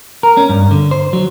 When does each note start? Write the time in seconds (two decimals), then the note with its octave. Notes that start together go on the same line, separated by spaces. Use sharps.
0.23 A#4
0.37 C#4
0.49 G2
0.71 D3
0.91 C5
1.13 F#3